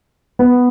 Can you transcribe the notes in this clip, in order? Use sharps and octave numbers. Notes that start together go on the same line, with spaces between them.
B3